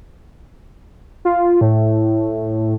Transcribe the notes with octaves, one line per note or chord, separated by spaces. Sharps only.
F4
A2